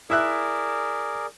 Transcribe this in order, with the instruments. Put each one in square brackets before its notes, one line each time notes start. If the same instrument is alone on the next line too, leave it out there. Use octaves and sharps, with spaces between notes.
[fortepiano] E4 E5 F#6 [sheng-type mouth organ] G#4 A#4 D5